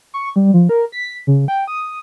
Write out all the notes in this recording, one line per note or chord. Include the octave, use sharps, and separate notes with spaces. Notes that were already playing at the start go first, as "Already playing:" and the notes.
C#6
G3
F3
A#4
B6
C#3
G5
D#6